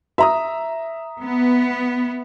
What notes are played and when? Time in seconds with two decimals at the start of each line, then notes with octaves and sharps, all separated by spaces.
0.18 E5 A#5 D#6
1.21 B3